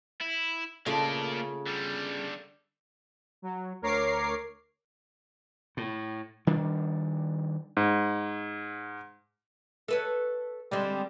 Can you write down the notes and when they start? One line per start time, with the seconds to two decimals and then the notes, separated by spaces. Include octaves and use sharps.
0.21 E4
0.86 C#3 A3 A#3 F4 D5
1.67 D3 G3
3.42 F#3
3.82 D2 A#4 C#5 D6 C7
5.77 A2
6.47 D#3 G3 D4
7.77 G#2
9.88 A4 B4 C#5
10.72 D3 G3 G#3 C4